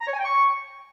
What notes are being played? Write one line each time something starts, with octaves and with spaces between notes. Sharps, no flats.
A#5
C#5
G#5
G5
C#6